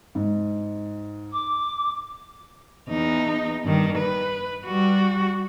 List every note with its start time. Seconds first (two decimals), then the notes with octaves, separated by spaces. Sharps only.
0.15 G#2
1.32 D6
2.90 E2 D#4
3.64 G2 D#3
3.98 B4
4.66 G3 F#4